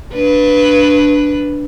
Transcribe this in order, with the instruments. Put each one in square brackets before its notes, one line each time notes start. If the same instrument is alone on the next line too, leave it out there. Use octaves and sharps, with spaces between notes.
[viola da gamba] D4 B4